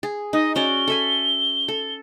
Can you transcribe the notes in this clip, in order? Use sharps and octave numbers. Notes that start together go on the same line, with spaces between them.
G#4
D#4 D#5
C#4 F#4 D5 G7
A4 E5 G#5
A4